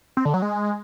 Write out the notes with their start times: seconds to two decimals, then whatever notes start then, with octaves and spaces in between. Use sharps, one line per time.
0.17 C4
0.25 D3
0.34 F#3
0.42 G#3